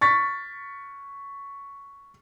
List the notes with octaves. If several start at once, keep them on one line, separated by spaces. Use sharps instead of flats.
C#6 A6 B6